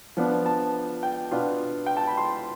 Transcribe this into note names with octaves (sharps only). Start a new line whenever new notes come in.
F3 B3 D4
A5
G5
B2 B3 D4 F4
G5
A5
B5
C6